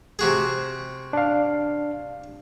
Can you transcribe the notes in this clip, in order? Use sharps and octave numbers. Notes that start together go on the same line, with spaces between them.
C3 F#4 G#4
D4 F5